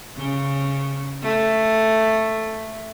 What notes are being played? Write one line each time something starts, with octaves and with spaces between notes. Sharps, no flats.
C#3
A3